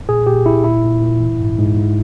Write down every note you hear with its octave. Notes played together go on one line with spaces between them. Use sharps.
A#2 G#4
A#2 G4
A#2 E4
A#2 E4
A#2
A#2
E3
G#2
G#2
G#2